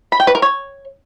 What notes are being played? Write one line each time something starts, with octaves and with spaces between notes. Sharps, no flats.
B5
G5
B4
A#4
C#5